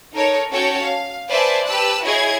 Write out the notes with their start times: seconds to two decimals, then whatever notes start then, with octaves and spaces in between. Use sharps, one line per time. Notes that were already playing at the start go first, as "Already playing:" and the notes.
0.14 D#4 A4 A#4 C#5
0.51 C#4 F#4 A4 C#5 G5 A5
0.82 F5
1.29 B4 C5 D5 E5 G#5 A5
1.66 G4 B4 A5 E6 F#6
2.04 E4 F#4 G#4 C#5 D#5 G#6